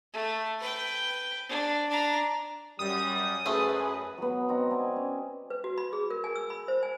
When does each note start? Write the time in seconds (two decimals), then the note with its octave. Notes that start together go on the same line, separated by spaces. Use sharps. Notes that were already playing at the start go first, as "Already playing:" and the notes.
0.13 A3
0.60 B4 G5
1.49 D4
1.89 D4 A#5
2.79 F#2 G3 D#6
3.46 F#2 A3 G#4 A4 B4 C5
4.18 F#3 B3
4.49 C4 D#4
4.71 D5 G#5
4.96 C#4
5.50 B4
5.64 F#4
5.78 B5
5.93 G#4
6.11 A#4
6.24 G#5
6.36 E6
6.50 B5
6.68 C5
6.83 G#5